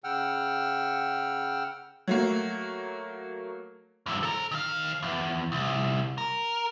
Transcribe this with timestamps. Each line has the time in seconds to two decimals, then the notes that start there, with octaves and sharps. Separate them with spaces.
0.04 C#3 F#5 G5 E6 F6
2.08 F#3 A3 A#3
4.06 E2 G2
4.23 A4 A#5
4.52 D#3 F5
5.03 E2
5.52 C2
6.18 A#4